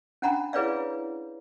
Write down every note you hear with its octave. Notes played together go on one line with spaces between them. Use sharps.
C#4 D4 F#5 A#5 B5
E4 G#4 B4 C#5 D5 F5